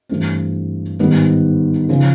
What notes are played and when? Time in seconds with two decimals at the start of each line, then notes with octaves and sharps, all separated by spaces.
0.09 G2 E3 A3 C4
0.99 G#2 D#3 G3 B3 D#4
1.89 C#3 F3